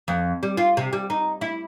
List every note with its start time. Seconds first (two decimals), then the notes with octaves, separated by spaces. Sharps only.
0.08 F2
0.43 G3
0.57 F4
0.77 C3
0.93 G3
1.10 D#4
1.41 E4